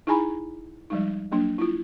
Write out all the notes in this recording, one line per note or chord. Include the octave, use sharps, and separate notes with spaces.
D#4 E4 G#4 G#5 A#5 B5
F3 G3 G#3 D#4
F#3 A#3 D4
E4 F4